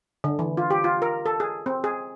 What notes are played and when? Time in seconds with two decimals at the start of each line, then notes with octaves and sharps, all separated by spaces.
0.24 D3
0.39 E3
0.57 F4
0.71 G4
0.84 F4
1.02 A#4
1.26 A4
1.40 G#4
1.66 C4
1.84 G#4